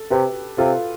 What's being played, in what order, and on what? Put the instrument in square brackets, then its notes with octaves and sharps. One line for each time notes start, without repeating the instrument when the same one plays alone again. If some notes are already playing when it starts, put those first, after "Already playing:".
Already playing: [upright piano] A4
[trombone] C3 [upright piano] G4 B4
[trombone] C3 [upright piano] F4 A4